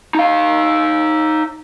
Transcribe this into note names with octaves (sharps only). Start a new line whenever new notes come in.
D#4 F5